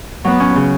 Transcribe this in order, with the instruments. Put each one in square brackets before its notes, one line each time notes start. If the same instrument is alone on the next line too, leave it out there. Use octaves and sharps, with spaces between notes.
[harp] F#3 [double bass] B3
[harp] C#4
C#3